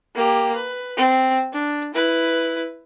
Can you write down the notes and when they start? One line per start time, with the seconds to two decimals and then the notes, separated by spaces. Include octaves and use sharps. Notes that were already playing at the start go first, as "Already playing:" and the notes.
0.15 A#3 G4
0.55 B4
0.97 C4
1.53 D4
1.94 E4 B4